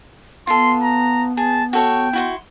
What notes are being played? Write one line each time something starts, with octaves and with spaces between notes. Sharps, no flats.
B3 F4 A4 C6
A#5
G#4 A5
F#4 A4 C#5 G5
E4 F#4 C6